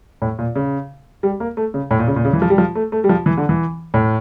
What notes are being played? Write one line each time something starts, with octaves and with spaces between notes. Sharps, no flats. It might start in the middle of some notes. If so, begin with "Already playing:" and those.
A2
A#2
C#3
G3
A#3
A3
C#3
A2
A#2
C#3
A#2
C#3
E3
F3
G3
F3
A3
A3
G3
F3
E3
D3
E3
A2